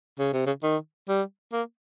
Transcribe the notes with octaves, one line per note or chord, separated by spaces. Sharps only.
C#3
C3
C#3
D#3
G3
A#3